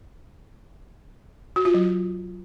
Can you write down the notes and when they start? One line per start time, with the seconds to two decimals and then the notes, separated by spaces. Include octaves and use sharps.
1.56 F#4
1.65 F4
1.74 F#3